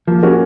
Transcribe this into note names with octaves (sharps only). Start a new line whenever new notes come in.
F3 A#3
C#4 F#4 A#4